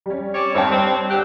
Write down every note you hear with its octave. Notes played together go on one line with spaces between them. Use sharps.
G3 C#4
C4 C#5 D5
G2 D#3 C4 C#5 A5
C4
D3 C4 G4 F#6